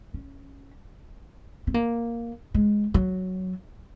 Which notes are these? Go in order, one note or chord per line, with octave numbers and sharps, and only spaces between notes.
C#4
C4
A#3
G#3
F#3